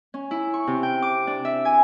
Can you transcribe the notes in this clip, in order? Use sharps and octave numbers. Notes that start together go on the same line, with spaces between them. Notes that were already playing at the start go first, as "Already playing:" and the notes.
C#4
E4
C#6
C3
G5
D6
D4
E5
G#5